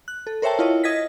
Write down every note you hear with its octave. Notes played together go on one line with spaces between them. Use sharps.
F#6
A4
A#4 C5 C#5 E5 G5 A5
E4 F4 C#5 D#5
D#5 G#6 A#6 B6